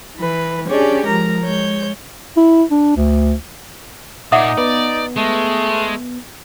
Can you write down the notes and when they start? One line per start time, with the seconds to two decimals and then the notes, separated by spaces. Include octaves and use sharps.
0.17 E3 B4
0.68 C#4 D4 G4 G#4 C#5 D5
1.05 F3 G#3 A#4 A#5
1.42 G#3 C#5 G6
2.37 E4
2.71 D4
2.97 D2
4.32 A#2 D#4 D5 E5 F#5 D6 D#6
4.58 B3 D5
5.17 G#3 A3